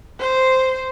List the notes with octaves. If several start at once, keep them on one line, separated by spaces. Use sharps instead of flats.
C5